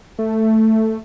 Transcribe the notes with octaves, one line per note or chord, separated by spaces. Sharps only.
A3